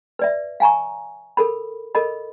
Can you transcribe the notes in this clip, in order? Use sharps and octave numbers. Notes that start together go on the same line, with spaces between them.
B4 D5 E5
F5 G#5 A#5 C#6
A4 A#4 B5
A4 A#4 D#5 B5